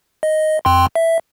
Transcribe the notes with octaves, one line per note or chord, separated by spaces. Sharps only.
D#5
F2 G5 C6
E5